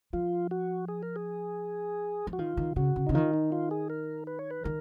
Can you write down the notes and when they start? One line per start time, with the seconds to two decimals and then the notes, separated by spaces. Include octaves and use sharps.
0.13 F3 F4
0.51 F#4
0.88 G#4
1.03 A#4
1.16 G#4
2.27 F3
2.33 F#4
2.39 D#3 F4
2.57 D#3
2.76 C#3 F#4
2.96 C#3
3.06 C#3 D#4
3.14 D#3 F4
3.34 D#4
3.52 F4
3.71 G#4
3.90 A#4
4.27 B4
4.39 C#5
4.51 B4
4.64 D#3 A#4